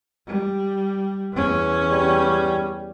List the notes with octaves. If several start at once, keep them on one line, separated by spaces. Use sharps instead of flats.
G3
E2 C#4
G3